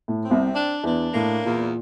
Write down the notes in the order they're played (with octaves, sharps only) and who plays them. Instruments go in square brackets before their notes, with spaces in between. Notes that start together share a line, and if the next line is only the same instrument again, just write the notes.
[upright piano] A2
[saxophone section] C4
[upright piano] C2 C3
[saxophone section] D4
[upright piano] E2 E3 [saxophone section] D4
[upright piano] A2 [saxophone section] A#3
[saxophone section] E2 [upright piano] A#2